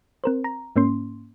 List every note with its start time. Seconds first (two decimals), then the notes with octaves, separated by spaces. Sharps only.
0.24 C4 A#4 C5
0.44 A#5
0.76 G#2 A#3 C#4 C6